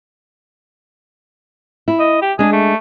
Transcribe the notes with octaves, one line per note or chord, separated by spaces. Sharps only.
E4
D#5
G4
G#3 D4 G#4
A3